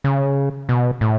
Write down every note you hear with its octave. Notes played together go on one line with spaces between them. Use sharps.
C#3
B2
A2